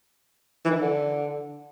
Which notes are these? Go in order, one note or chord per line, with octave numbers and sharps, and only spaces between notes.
E3
D#3
E3
D3